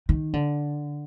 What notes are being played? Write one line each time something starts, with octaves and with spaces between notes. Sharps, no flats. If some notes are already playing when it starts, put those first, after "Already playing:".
D#3
D3